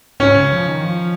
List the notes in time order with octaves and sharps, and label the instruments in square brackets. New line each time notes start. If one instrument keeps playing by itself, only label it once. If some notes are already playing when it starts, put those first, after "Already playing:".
[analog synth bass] G#2 [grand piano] C#4
[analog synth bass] C#3
F3
D#3
F3